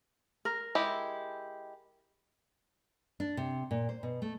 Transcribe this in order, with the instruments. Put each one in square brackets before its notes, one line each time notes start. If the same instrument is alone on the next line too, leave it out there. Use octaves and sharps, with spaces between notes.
[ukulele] A#4
[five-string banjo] G#3 E4 G4
[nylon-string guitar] D4
C3
A#2
C5
B2
A3